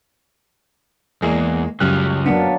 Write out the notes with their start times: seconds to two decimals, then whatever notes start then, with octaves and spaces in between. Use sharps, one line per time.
1.22 E2 G#3 A#3
1.80 C#2 F#2 C#3 G3 F6 F#6
2.26 F#3 A#3 B3 D4